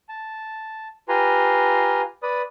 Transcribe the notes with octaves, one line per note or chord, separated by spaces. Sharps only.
A5
F4 G4 B4 G#5 A#5 C6
B4 D5 B5 D#6